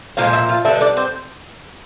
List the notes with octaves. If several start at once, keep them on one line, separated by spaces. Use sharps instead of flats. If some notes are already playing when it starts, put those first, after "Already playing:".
A#2 F3 G#3 F4 F5
E4 E5
F4 F5
D3 G3 B3 D4 E4 E5
D#5
D4 D5
C4 C5